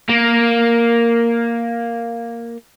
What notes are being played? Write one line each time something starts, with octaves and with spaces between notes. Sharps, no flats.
A#3 A#4